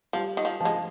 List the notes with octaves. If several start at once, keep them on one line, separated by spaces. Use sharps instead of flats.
F3 G3
D#3
F3
F3 G#3